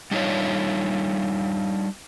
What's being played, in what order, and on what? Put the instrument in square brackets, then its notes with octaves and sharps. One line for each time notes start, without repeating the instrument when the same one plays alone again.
[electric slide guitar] G3 D4 D#4 F4 C#5 F5